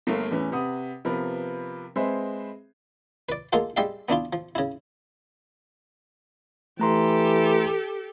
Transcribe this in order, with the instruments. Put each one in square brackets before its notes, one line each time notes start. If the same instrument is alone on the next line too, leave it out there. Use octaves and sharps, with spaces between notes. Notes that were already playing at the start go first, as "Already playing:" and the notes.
[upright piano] G1 A3 A#3 F5
E2 A2 E3 B3 C#4
C3 B4 F#5 D#6
C3 F3 B3 C4 A#4 B4
G#3 C4 G#4 B4 C5 E5
[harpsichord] B4 D5
G#3 A#3 F4 A4 F#5
G3 G#3 G4 E5 F5
B3 D4 E4 F4
F3
C#3 E4
[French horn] E3 [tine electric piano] A3 A#5 C6 [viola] G4 A4